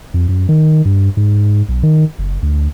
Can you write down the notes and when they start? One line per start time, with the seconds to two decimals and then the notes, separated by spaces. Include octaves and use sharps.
0.14 F2
0.29 F#2
0.49 D#3
0.85 G2
1.17 G#2
1.69 B1
1.83 D#3
2.19 F#1
2.42 D2